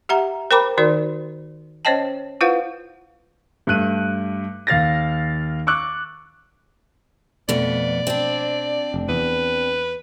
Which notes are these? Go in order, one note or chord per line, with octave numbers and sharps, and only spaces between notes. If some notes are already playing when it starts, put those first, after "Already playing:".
G4 E5 F#5 A#5
A#4 C5 G5 A#5 B5 D6
D#3 D#4 F#4 A#4 D5
C#4 C5 C#5 D#5 G5 A5
E4 F4 B4 C5 F5 F#5
G2 A3 F#6 D#7
D#2 F5 A6 A#6
C#6 D6 E6 F#6
F2 B2 A3 B3 D5
C4 D4
F1
E2 B4